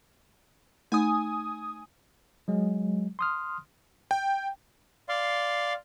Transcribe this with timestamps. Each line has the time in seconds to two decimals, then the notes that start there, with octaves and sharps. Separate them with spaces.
0.92 A3 D#4 G#5 D#6
2.48 F#3 G#3
3.19 C6 D#6 F6
4.11 G5
5.09 D5 F5 C6